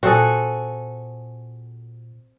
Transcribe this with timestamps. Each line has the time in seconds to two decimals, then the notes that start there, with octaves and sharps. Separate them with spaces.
0.03 A#2 C4 F#4 G#4 A4